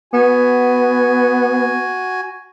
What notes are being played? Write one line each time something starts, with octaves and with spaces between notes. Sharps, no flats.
B3 F#4 G#5